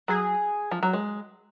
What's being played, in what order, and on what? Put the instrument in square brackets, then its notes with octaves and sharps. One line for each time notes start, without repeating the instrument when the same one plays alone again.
[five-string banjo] F#3 [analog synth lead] G#4
[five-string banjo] F3
F#3
G#3